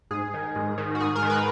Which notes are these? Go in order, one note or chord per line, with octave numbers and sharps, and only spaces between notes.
G#2 G#4
D#3
G#2
D#3
F#4
G#2 G#4
A#4
D#3
B4